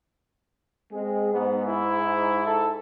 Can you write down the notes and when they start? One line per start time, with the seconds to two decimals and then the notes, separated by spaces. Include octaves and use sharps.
0.91 G#3 C4 G#4
1.33 G#2 B3
1.67 E4
2.46 A4